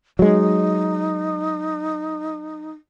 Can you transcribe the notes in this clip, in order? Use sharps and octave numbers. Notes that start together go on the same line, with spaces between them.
F#3 G#3 D#4